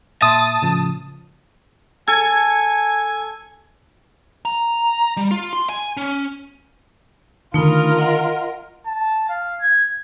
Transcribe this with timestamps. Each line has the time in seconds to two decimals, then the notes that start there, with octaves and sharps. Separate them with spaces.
0.22 A#2 E5 A5 C6 D#6
0.62 A2 C#3 F3
2.08 A4 G#5 G#6
4.45 A#5
5.17 G3
5.31 F4
5.53 C6
5.69 G#5
5.97 C#4
7.54 D3 D#3 A3 D#4 F4 A#4 B5
7.98 D#5 F#5
8.87 A5
9.29 F5
9.61 G#6